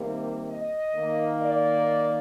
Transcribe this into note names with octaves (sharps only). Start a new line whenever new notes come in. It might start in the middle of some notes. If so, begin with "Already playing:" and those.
Already playing: C3 D#3 G3 A#3
D#5
D#3 A#3
D5